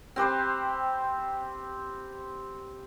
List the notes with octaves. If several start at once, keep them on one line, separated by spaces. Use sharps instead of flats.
C4 G4 B4 C5